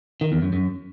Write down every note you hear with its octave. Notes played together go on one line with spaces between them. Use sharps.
D#3
E2
F#2
F#2